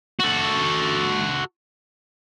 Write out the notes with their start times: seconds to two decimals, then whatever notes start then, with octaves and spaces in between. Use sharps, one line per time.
0.20 F#4 A4